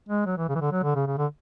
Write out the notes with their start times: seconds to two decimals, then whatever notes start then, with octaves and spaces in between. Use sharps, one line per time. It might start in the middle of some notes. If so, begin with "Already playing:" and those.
0.09 G#3
0.26 F#3
0.37 E3
0.49 C#3
0.55 E3
0.61 D3
0.72 F#3
0.83 D3
0.95 C#3
1.07 C#3
1.18 D3